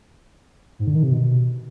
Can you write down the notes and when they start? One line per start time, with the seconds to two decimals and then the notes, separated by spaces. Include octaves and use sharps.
0.79 G#2
0.87 D3
0.95 D#3
1.03 C3
1.11 B2